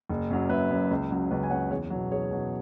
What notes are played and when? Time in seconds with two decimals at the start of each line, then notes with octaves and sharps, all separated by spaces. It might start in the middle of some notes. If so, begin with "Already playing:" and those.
0.10 F#1
0.30 F#2 F#3
0.49 F#1 B4 E5
0.70 F#2 F#3
0.91 C#2
1.11 C#3 F#3
1.31 C#2 B4
1.43 G#5
1.50 C#3 F#3 C#5 F#5
1.70 E2 G#4 C#5
1.90 B2 F#3
2.11 E2 G#4 C#5
2.31 B2 F#3